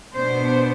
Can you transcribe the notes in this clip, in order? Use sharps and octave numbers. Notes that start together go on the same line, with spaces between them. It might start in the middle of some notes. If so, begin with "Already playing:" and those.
B2 B3 D4 C5